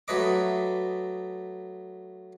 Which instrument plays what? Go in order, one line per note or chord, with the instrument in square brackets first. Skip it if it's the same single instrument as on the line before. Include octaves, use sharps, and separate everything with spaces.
[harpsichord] F#3 A3 B4 D#5 D6